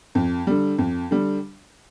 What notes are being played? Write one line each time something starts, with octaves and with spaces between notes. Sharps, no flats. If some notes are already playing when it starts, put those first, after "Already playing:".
F2
D3 G3
F2
D3 G3